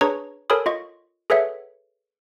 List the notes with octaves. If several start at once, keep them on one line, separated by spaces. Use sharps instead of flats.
D4 G#4 B4 C#5 A#5 C#6
A4 A#4 C#5 G#5 B5 D#6
F4 D#5 C#6
G#4 A4 B4 C#5 E5 F#5